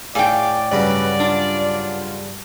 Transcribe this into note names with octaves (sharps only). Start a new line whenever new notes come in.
A2 G#4 D5 F5 G5
G2 C#3 F#3 B4 D5
D4 F4